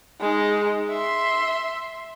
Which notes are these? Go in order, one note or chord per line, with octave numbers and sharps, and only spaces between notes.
G#3 D#4
E5 C6